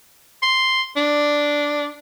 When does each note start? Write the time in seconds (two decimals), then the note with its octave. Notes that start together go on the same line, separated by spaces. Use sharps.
0.43 C6
0.97 D4